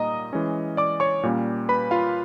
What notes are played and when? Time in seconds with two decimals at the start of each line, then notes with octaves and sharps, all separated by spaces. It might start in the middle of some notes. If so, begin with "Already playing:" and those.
Already playing: A#2 G3 A#3 D#4 D#5 A#5 D#6
0.33 E3 G#3 C#4
0.77 D5 D6
1.00 C#5 C#6
1.23 A#2 G3 A#3 C#4
1.69 B4 B5
1.91 F4 F5